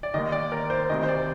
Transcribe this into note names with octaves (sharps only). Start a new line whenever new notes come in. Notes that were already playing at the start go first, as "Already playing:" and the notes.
D5
D#2 D#3 D#5
D5
A#4
C5
D2 C3 D#3 D#5
C5
D5